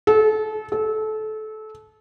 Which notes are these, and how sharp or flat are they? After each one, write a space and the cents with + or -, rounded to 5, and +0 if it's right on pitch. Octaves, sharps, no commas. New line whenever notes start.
A4 -30
A4 -25